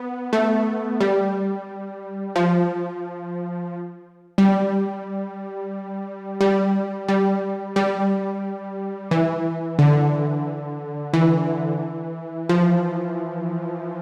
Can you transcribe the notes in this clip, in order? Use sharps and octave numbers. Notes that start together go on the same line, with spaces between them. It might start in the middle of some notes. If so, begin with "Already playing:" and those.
Already playing: B3
A3
G3
F3
G3
G3
G3
G3
E3
D3
E3
F3